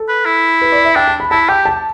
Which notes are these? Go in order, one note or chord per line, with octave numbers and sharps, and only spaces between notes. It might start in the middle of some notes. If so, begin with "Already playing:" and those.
Already playing: A4
B4
E4
B4
D5
E5
D4 G5
A5
B5
E4 A5
G4 G5
A5